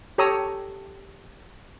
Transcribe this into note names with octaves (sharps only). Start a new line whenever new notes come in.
G4 A4 C#5 A#5 D#6 E6